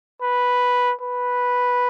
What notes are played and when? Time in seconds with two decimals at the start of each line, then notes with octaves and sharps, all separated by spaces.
0.22 B4
1.01 B4